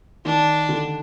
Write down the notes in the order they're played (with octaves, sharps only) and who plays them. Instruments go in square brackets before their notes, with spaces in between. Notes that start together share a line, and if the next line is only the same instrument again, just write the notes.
[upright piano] D#3 [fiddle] D4
[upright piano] D3